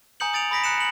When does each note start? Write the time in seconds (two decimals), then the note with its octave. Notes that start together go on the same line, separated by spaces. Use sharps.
0.20 G#5 A#5 D#6 G6 C#7 F#7
0.33 D#6 A6 D7 F7
0.51 B5 D#6 A#6 B6 D7
0.64 A#5 F#6 C#7 E7
0.77 C#7 F#7